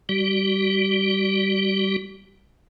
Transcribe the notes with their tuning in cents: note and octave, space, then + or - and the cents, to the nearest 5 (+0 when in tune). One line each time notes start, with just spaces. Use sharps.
G3 +0 G4 -45